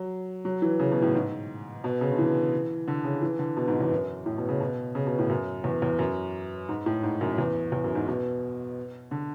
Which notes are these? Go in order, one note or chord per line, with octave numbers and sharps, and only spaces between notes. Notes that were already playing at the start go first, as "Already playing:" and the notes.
Already playing: F#3
F#3
E3
C#3
B2
A2
G#2
B2
C#3
D3
E3
D3
C#3
E3
D3
B2
G#2
E2
F#2
A2
B2
C#3
B2
C#3
B2
A2
F#2
E2
E2
F#2
G#2
A2
G#2
F#2
E2
E2
F#2
G#2
B2
D3